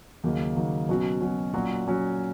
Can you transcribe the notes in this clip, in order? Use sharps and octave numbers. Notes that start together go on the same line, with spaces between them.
D#2 C#3 F#3 A#3 D#4
D#2 C#3 F#3 A#3 D#4
B2 F#3 C#4 F#4
B2 F#3 C#4 F#4
A#2 F#3 C#4 F#4
A#2 F#3 C#4 F#4